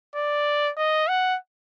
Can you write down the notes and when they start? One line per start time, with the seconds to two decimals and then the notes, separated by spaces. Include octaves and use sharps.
0.15 D5
0.78 D#5
1.09 F#5